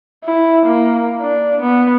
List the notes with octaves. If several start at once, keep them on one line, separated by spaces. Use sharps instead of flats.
E4
A#3
D4
B3